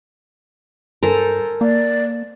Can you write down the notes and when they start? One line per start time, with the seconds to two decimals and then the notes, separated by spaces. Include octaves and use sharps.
1.03 G2 A4 A#4 C5 G#5
1.61 A#3 D5